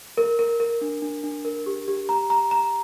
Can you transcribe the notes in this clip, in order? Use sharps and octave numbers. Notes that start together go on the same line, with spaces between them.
A#4
A#4
A#4
D4
D4
D4
A#4
G4
G4
A#5
A#5
A#5